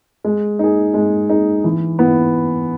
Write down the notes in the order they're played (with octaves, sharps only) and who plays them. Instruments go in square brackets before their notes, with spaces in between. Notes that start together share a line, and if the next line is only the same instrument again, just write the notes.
[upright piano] G#3
D#4 G#4
G#3
D#4 G#4
E3
B3 E4